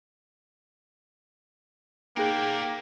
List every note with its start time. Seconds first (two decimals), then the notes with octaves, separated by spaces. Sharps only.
2.17 A#3 D#4 G#4 A#4 B4 D5 G5